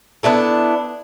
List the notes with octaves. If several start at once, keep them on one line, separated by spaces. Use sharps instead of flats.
B3 D4 E4 A4